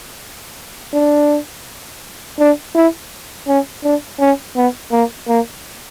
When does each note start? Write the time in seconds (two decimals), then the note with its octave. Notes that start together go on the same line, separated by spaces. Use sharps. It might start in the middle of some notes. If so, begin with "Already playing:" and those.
0.94 D4
2.39 D4
2.75 E4
3.48 C#4
3.84 D4
4.20 C#4
4.56 B3
4.92 A#3
5.28 A#3